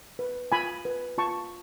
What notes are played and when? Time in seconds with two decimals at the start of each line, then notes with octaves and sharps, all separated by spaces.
0.19 B4
0.52 F4 G#5 B5
0.85 B4
1.18 F4 A5 C#6